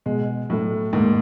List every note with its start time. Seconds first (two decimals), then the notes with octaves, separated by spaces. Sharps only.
0.06 B2 G#3
0.50 A2 F#3 A3
0.93 D#2 G#2